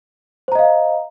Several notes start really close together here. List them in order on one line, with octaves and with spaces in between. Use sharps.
C5 A#5 D#5 F5